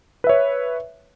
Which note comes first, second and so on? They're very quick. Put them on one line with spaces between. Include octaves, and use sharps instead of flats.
B4 E5 C#5